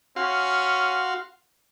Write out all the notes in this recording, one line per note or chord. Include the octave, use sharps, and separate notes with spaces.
C#4 F#4 F5 C6